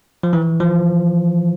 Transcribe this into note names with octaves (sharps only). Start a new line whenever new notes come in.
F3
E3
F3